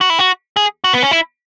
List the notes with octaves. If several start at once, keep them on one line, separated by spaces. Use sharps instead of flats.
F#4
E4
F#4
G#4
F#4
B3
C#4
E4